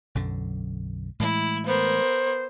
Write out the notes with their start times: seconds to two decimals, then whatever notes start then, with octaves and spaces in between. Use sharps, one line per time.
0.15 B1 F#2 D3
1.20 A2 E3 G#3 E4
1.66 B3 A#4 C5